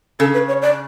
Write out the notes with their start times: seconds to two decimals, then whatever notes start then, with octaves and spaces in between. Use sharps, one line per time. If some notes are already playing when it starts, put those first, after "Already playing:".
0.19 C#3 A4
0.34 B4
0.48 C#5
0.62 D5